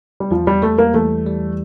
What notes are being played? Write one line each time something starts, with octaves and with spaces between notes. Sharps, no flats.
G3
E2 F3
G3
G3 A3
A#3
E3 A3
G3